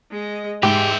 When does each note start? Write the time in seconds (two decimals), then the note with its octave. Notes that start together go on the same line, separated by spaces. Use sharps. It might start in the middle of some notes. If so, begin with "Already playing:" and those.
0.11 G#3 D#5
0.63 G#2 G#3 G4 B4 E5 G5